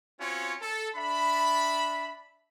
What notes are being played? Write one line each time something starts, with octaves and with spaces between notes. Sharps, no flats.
C4 C#4 F4 F#4 C#5
A4
D4 E5 B5